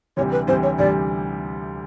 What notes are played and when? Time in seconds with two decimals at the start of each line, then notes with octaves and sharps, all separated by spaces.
0.17 D2 C3 E3 G3 C#5
0.32 B4
0.47 D2 C3 E3 G3 C5
0.63 C#5
0.79 D2 C3 E3 G3 D5